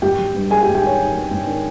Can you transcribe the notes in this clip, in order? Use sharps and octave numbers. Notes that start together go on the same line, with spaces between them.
G#1 G4 G5
F#3
G2
F#3 G#4 G#5
G4 G5
G#1
G4 G5
D#3 C#5
D#3
F#3
G#1
D#3